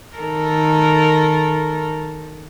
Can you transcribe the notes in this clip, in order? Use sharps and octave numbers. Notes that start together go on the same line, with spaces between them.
D#3 A4 A#4